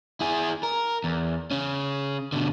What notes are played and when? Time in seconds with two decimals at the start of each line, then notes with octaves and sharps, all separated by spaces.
0.21 E4 G#4
0.63 A#4
1.04 E2
1.51 C#3 C#4
2.32 B2 D3